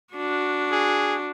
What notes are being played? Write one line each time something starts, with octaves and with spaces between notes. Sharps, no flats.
D4 F#4
G#4